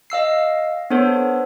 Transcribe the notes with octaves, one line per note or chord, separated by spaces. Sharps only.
D#5 F5 E6 C7
B3 D4 A4 C5 C#5